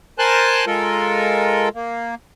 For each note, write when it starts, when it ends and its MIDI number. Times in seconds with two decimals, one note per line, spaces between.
0.19 0.65 70
0.19 0.65 72
0.19 0.65 80
0.19 0.65 81
0.19 0.65 84
0.19 0.65 90
0.67 1.69 56
0.67 1.69 65
0.67 1.69 69
0.67 1.69 70
1.75 2.15 58